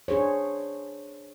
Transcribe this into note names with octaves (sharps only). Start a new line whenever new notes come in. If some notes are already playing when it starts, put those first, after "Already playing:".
D4 G#4 C5 C#5